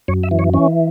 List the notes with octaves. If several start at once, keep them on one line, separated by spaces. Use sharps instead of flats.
F#2 C#5
E5
E3
C#5
E3 C#4